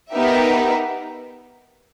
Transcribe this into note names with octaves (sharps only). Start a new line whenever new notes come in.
B3 D#4 G4 A#4 E5